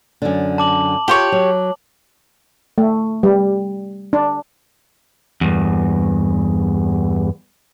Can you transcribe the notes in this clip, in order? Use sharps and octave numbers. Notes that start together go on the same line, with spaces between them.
F#2 D3
A5 D6 F#7
F4 G4 C5 C#5
F#3
A3
G3
D4
E2 G2